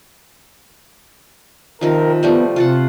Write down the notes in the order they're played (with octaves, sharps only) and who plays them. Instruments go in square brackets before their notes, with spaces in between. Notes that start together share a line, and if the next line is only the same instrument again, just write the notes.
[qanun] C3 D#3 F3 [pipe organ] A#4
[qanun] F3 G3 A3 [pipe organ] B3
[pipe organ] C3 [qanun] F4 A4 F#5